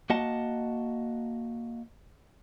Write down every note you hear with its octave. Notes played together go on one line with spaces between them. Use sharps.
A#3 F#4 D#5 F#5 A5